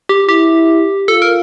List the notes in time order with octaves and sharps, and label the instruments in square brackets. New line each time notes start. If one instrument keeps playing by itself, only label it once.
[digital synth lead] G4
[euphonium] E4 [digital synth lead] G4
[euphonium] F4 [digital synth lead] A4
[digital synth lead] A#4